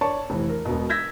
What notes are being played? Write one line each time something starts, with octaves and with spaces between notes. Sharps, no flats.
C#5 D5 A5 C#6
F1 E3
A#4
E1 B2
E6 G6 G#6 A#6 B6